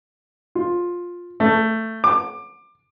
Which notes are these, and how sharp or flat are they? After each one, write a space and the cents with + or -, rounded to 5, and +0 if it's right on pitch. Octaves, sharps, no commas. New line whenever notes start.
F4 +10
A3 +15
D6 +20